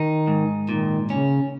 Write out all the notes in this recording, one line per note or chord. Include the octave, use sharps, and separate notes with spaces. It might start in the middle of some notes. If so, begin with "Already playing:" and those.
Already playing: D#3 D#4
G#2
A#2 D#3
C#3 C#4